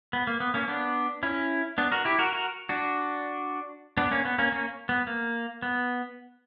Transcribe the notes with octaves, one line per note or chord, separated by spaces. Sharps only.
B3
A#3
B3
A#3 C#4
B3 D4
C#4 E4
B3 D4
F#4 A#4
E4 G4
F#4 A#4
F#4 A#4
D4 F#4
B3 D4
A#3 C#4
B3
A#3 C#4
A#3 C#4
B3
A#3
B3